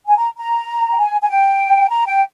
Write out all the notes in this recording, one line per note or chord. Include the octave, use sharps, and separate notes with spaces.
G#5
A#5
A#5
G5
G#5
G#5
G5
A#5
G5